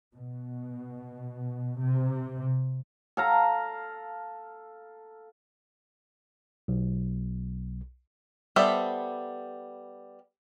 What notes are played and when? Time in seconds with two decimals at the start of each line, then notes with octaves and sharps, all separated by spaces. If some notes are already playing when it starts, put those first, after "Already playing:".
0.14 B2
1.80 C3
3.17 A4 F5 A#5
6.68 B1
8.56 G3 B3 A4 C5 E5